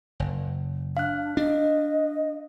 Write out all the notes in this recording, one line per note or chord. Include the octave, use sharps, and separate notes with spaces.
F#1
D4 F5 F#6
D4 D#5